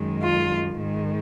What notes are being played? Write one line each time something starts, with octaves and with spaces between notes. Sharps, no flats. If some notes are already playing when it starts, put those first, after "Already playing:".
Already playing: F#2 D#3 G#3
F4
G#2 D#3 G#3